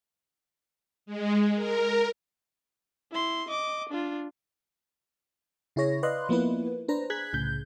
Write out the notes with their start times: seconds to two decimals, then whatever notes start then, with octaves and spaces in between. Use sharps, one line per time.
1.06 G#3
1.56 A#4
3.12 E4 C6
3.49 D#5 D6
3.89 D4 F4
5.76 C#3 E4 G#4 C#5 A#6
6.03 B4 D5 D#5 F5 C6 F#6
6.29 F3 A#3 B3 E4 B4
6.88 D4 B4 C5 A#5
7.10 G#4 F#6 G#6 B6
7.33 C2 A2 C#3 G6